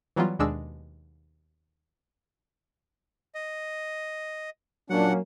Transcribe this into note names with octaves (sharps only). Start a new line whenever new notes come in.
E3 F#3 G3 B3 F4
D#2 B2 G#3 D4 G#4 E6
D#5
A#2 F#3 A#3 C#4 D4 F#5